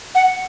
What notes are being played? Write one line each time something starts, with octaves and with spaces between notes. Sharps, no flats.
F#5